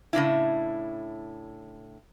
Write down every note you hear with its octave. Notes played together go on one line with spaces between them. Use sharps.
A2 C#3 D4 E4